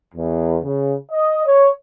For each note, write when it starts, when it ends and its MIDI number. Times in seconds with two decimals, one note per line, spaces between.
0.14 0.57 40
0.63 0.94 49
1.11 1.43 75
1.45 1.68 73